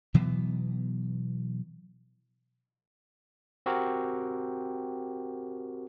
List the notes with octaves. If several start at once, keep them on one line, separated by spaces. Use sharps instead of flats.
B2 E3 F#3 B3
C4 F#4 G4 A#4